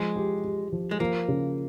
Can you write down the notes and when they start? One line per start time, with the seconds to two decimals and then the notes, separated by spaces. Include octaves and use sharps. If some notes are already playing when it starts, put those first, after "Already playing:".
Already playing: F3 G#3
0.16 G4
0.44 G4
0.72 F3
0.91 G#3
1.00 F3 A#3
1.28 C#3